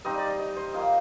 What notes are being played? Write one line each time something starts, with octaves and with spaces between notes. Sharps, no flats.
G3 C4 D#4 D#5
D5
D#5
D#5
C5
A#3 F4 D#5